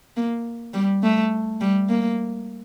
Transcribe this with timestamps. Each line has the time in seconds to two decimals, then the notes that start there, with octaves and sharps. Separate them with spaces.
0.17 A#3
0.74 G3
1.03 A3
1.61 G3
1.89 A#3